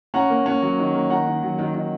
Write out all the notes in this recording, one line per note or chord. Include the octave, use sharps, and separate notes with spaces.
C#4 F#5 A#5
A#3
C#4
F#3
D#3
A#3
D#3 F#5 A#5
D#3
F#3
D#3
D#3